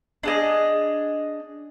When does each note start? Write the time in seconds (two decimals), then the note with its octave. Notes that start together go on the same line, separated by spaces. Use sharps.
0.23 D4 G#4 D#5